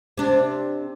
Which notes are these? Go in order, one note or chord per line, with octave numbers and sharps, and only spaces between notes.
C3 D4